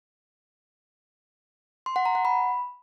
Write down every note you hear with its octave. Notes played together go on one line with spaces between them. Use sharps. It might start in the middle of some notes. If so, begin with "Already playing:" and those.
C6
F#5
A#5
F#5
B5